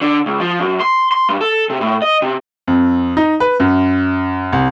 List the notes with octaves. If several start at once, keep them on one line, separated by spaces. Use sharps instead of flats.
D3
C#2
F3
F#2
C6
C6
G2
A4
C3
A2
D#5
C3
F2
D#4
B4
F#2
C2